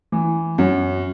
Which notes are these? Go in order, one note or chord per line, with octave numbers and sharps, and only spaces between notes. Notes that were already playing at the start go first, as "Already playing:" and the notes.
E3
F#2